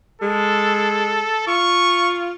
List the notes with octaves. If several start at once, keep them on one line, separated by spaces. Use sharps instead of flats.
G#3 A4
F4 C#6